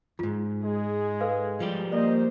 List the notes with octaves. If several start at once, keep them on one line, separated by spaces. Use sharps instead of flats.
E2 G#2 F4
G#3 G#4
A4 B4 F5
F3 G3 G4
A#3 C5 D5 D#5